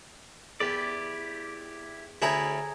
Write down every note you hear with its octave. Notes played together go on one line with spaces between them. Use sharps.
E2 E4 G4 D5
D2 E4 G#4 C#5 G#5 A#5